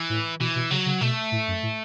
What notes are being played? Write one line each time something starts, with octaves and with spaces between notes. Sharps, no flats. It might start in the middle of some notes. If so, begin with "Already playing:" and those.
Already playing: E3
A2
B2 E3
B2
C#3 F#3
C#3
B2 A3
A2
F#2
A2